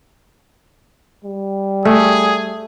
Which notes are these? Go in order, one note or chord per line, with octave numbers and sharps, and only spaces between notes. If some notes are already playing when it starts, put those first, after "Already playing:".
G3
A3 G#4